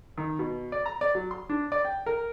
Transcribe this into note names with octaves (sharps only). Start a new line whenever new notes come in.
D#3
B2
D5
A#5
D5
F#3
C6
D4
D5
G5
A#4